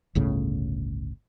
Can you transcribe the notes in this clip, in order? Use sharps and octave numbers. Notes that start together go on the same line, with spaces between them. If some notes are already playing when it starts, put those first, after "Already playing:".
G1 C#2 A2 C#3